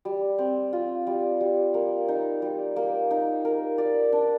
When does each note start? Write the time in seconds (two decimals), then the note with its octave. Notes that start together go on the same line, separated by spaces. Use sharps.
0.05 G3
0.38 C4
0.73 F4
1.07 G3
1.41 G3
1.74 A#3
2.08 D#4
2.42 G3
2.76 A#3
3.11 D#4
3.45 A#4
3.78 D5
4.12 D4